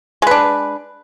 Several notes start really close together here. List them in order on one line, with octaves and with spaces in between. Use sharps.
G#3 B4 D4